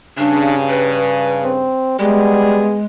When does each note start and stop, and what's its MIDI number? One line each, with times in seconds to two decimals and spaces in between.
0.18 1.72 43
0.18 1.72 49
0.18 0.56 62
0.70 1.52 71
1.43 1.98 60
1.99 2.65 55
1.99 2.86 56
1.99 2.80 59
1.99 2.80 68